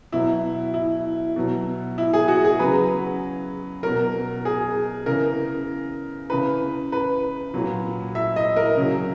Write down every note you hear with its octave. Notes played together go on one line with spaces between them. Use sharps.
B2 F#3 E4
E4
B2 F#3
E4
G#4
F#4
G#4
C#3 F#3 B4
B2 F#3 A#4
G#4
C#3 E3 A#4
C#3 E3 B4
B4
A#2 F#3
E5
D#5
A#4
C#3 F#3